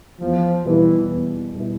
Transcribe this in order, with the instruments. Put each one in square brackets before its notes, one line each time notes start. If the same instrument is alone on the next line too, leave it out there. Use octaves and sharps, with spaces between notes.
[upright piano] E2 [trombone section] F3
[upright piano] B2 G3 B3 E4 [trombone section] E3
[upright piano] E2
B2 G3 B3 E4